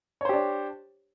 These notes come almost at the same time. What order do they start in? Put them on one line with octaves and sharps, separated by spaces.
C#5 C5 G4 D4